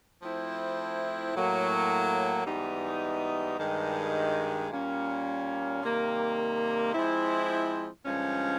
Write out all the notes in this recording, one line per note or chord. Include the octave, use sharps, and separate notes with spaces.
F3 A3 C4 E4
A2 F#3 A#3
G#2 E3 G3 B3 D#4
G2 D#3 G#3
A#2 G3 A#3 C#4
C3 D#3 G3 A#3
F3 G#3 C4 E4
G2 D3 F3 G#3 C#4